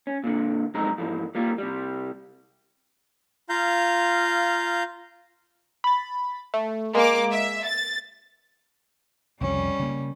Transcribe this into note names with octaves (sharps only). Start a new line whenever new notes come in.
C#4
A#2 D3
B1 F2 G#3 C4 D#4 A#5
G#2 E3 F3
G3 A#3 F4
C3 G3
F4 F5 A#5 G6
B5 A6
A3
G#3 A#3 D6
E5
A6
C2 F2 C#3 G3 C#4
C#3 A#3